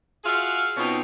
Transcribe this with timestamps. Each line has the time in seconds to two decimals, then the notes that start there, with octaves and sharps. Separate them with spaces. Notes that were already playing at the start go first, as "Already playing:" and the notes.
0.24 F4 F#4 G#4 E5 F5
0.77 B2 C4 C#4 D#4 F4